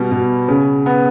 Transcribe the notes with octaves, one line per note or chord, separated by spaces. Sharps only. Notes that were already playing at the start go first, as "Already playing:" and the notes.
Already playing: B2 G3
B2
C#3
B3